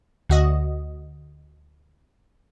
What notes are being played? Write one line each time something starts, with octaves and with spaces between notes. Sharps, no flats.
D2 F#4 D#5